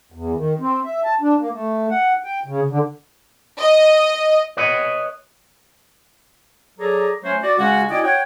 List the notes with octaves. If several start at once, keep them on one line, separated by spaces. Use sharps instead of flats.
E2
D#3
C4
E5
A5
D4
A#3
A3
F#5
G5
C#3
D3
D#5
B4 C#5 D#5
F#3 G#4 A4 D5 A#5
F#3 A3 C#4 F#4 C5 C#5
F#4 D5
C#3 G#3 C#4 F#4
C#4 E4 F#4 D5 D#5 G5
C#5 F#5 G5